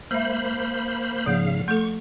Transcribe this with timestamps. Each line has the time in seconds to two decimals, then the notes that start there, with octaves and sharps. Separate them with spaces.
0.11 G#3 A#3 C5 E5 B5
1.26 G#2 C#3 F3 A#3 F5
1.68 A3 A4 C#6